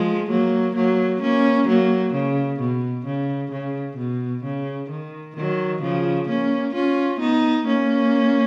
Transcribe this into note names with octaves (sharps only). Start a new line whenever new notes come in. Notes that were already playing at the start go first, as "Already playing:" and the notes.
Already playing: F3 G#3
F#3 A#3
F#3 A#3
A#3 C#4
F#3 A#3
C#3
B2
C#3
C#3
B2
C#3
D#3
D#3 F#3
C#3 F3
A#3 C#4
C#4 F4
B3 D#4
A#3 C#4